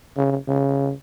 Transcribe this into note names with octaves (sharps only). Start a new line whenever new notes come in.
C#3
C#3